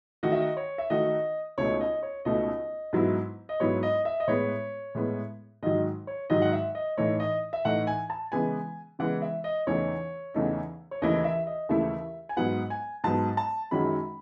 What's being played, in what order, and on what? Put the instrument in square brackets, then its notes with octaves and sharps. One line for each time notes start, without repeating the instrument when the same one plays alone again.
[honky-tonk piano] D#3 A3 D#4 F#4 [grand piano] D#5
[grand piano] E5
D#5
C#5
E5
[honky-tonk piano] D#3 A3 D#4 F#4 [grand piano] D#5
[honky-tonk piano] C#2 B2 A3 D#4 [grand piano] C#5
[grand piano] D#5
C#5
[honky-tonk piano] C#2 B2 A3 D#4 [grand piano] D#5
[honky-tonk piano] G#2 F#3 B3 E4
[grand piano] D#5
[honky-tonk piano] G#2 F#3 B3 E4 [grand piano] C#5
[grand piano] D#5
E5
D#5
[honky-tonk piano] A2 G#3 B3 [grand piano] C#5
[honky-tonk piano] A2 G#3 B3
[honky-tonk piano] G#2 D#3 F#3 [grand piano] D#5
[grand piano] C#5
[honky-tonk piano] G#2 D#3 F#3 [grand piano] D#5
[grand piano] F#5
E5
D#5
[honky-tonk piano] A2 E3 A3 D#4 [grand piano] C#5
[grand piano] D#5
E5
[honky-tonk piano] A2 E3 A3 D#4 [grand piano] F#5
[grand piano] G#5
A5
[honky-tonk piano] C#3 E3 G#3 B3 [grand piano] G#5
[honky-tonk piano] C#3 E3 G#3 B3 [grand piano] F#5
[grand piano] E5
D#5
[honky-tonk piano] E2 C#3 E3 A3 D#4 [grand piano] C#5
[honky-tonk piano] E2 C#3 E3 A3 D#4
[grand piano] C#5
[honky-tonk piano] D#2 C#3 E3 A3 E4 [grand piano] D#5
[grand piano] E5
D#5
[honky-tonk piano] D#2 C#3 E3 A3 E4 [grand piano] E5
[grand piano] G#5
[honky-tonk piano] G#2 F#3 B3 [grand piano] F#5
[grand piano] G#5
[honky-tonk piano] G#2 F#3 B3 [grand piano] A5
[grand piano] A5
[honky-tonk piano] F#2 D#3 G#3 C#4 F#4 [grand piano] B5